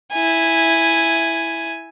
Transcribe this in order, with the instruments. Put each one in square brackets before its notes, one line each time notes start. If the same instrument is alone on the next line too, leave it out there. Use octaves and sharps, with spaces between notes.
[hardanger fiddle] E4 G#5